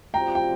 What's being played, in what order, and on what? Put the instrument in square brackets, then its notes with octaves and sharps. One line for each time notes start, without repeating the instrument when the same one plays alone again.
[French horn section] C3 G3 C4 F4 [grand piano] G5 A#5
[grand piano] G5